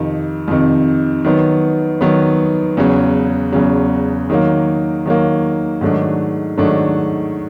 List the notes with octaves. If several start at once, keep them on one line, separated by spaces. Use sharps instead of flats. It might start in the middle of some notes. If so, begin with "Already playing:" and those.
Already playing: F2 C3 D#3
F2 C3 D#3
D#3 F#3 B3
D#3 F#3 B3
E2 C#3 F#3
E2 C#3 F#3
D#3 F#3 A#3
D#3 F#3 A#3
G#2 D#3 F#3 A3 D4
G#2 D#3 F#3 A3 D4